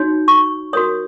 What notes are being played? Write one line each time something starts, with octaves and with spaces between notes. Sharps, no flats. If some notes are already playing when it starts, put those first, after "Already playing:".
Already playing: D#4 F#4 C#5
C#6
F#4 A#4 C#5 D#6